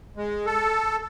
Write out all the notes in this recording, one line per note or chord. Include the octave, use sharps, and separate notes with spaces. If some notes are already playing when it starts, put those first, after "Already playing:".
G#3
A4